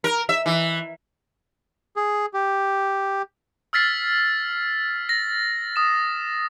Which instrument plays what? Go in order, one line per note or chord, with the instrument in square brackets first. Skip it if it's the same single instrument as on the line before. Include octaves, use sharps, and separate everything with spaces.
[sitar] A#4
E5
E3
[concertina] G#4
G4
[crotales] E6 F6 A6 B6 C7
A#6
D#6 E7